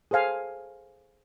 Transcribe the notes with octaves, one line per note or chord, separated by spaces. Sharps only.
G#4 A4 C5 F5 G#5